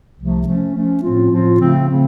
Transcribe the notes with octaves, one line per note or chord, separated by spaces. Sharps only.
C2 C3 F3 A3
F3 A3 C#4
F3 A3 C#4
A2 F3 C4 F4
A2 F3 C4 F4
C#3 F3 A3 C4
C#3 F3 A3 C4